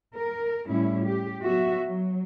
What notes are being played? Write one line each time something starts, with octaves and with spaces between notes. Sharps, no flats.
A#4
A2 G3 C#4 E4
G4
F#3 B3 F#4 E5
F#3